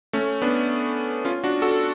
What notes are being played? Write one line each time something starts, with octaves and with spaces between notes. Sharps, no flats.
A3 C#4
B3 D4
C#4 F4
D4 F#4
F#4 A4